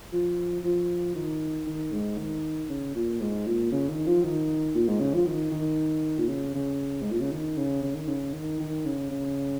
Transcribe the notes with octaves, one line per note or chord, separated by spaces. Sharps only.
F3
F3
D#3
D#3
G#2
D#3
C#3
A#2
G#2
A#2
C#3
D#3
F3
D#3
A#2
G#2
C#3
F3
D#3
D#3
A#2
C#3
C#3
G#2
A#2
C#3
D#3
C#3
C#3
D#3
C#3
D#3
D#3
C#3
C#3